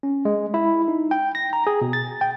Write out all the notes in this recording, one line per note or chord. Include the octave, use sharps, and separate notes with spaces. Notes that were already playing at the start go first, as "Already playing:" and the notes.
C#4
G#3
E4
D#4
G5
A#6
A#5
G#4
B2
A6
G5